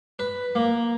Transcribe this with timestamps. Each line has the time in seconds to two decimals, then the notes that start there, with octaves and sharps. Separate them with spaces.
0.19 B4
0.55 A#3